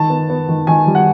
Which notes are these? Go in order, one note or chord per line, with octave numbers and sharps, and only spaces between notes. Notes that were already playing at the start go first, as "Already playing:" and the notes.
Already playing: D#3 A5
B3
B3
D#3
D#3 G#5
G3
F#5